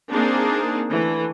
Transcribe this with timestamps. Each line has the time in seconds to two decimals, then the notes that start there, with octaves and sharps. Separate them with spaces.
0.10 A#3 C4 D4 D#4 G#4 A#4
0.88 D3 E3 A3